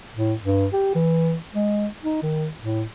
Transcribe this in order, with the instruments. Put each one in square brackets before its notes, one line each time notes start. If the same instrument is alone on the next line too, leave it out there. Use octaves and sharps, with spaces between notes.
[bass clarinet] A2
G2
G4
E3
G#3
D#4
D#3
A2